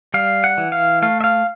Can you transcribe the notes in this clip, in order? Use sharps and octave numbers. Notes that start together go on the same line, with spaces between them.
G3 F5
F#5
E3
F5
A3 F5
E5
F5